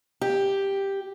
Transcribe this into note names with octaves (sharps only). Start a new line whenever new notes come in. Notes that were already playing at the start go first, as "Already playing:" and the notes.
G4